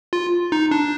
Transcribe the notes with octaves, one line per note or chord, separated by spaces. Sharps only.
F4
D#4
D4